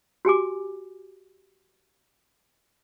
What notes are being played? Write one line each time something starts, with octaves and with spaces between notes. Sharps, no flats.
F#4 G4 G#5 D6